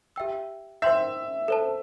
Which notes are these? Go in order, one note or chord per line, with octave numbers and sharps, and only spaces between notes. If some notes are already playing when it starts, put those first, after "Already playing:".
G4 E5 G5 E6
C5 E5 G5 C6 G6
A4 C5 A5